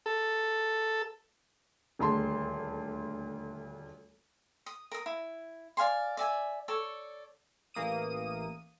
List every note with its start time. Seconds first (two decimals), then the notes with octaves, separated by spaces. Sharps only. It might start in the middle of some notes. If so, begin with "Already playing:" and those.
0.06 A4
1.99 D#1 D2 G#4 A5 C6
4.66 D#6
4.92 A#4 D#6
5.06 E4
5.77 D5 F5 G#5 C6
6.17 D5 E5 G#5
6.68 A4 C#5 D5
7.74 A1 E3 A#3 D#6 D#7